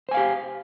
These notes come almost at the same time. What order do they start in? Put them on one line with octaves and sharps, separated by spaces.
C5 G#5 F5 G4